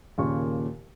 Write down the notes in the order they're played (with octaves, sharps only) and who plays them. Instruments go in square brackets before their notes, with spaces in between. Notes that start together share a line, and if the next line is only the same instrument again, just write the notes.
[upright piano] D#2 A#2 C#3 C#6